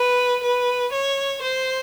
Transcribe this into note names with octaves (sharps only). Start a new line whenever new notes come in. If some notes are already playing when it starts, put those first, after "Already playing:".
Already playing: B4
B4
C#5
C5